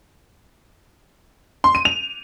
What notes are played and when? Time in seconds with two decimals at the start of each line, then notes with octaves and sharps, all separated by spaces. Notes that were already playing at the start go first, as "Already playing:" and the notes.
1.64 C6
1.75 D#7
1.85 F7